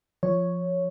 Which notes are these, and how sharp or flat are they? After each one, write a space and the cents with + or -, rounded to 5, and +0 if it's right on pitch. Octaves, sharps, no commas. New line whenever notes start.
F3 +0 C#5 +0